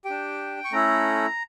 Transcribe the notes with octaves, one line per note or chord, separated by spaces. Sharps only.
G4 G5
D4
C#6
A3 C#4 E4 A4 A#5